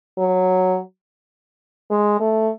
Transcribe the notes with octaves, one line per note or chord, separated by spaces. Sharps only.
F#3
G#3
A3